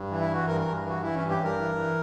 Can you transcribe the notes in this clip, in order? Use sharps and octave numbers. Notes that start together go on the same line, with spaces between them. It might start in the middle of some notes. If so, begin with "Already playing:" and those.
Already playing: G2
E3
E4
E3 F#4
G2 A#4
A#4
G2
E3 F#4
E3 E4
C#4
G2
G4
G2
A#4
E3
E3